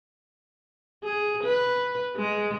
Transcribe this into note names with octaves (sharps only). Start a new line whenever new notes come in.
G#4
B4
G#3